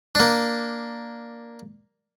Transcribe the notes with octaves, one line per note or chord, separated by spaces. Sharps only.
A#3 D4